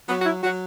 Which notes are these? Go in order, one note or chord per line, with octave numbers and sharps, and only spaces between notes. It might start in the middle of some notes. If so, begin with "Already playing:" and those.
F#3 B3
F#4
E4
F#3 F#4